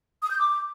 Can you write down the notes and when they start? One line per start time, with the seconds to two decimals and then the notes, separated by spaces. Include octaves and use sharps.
0.22 D#6
0.31 G6
0.39 D6